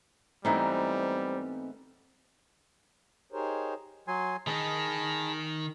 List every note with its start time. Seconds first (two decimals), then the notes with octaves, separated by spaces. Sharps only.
0.45 G#2 E3 G3 A3 B3 C4 D#4 C5
3.32 D#4 G4 G#4 A#4 C5 C#5
4.08 F#3 G#5 C6
4.47 D#3 D#4 G#4 A5 B5